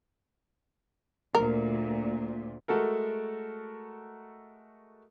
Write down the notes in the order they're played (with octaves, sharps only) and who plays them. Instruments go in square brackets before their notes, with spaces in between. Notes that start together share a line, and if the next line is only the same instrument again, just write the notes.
[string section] D2 A#2 [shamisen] A#4
[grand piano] G#3 A3 F#4 A4 A#4